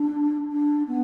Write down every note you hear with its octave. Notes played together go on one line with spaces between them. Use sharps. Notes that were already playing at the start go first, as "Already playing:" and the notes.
Already playing: D4
D4
B3